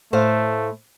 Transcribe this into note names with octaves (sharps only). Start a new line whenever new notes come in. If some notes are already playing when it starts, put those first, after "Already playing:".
A2 A3 C5 F5